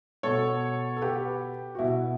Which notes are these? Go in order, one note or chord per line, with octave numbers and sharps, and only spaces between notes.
B2 A4 C#5
A4
G4 B4
F#4
B2 E4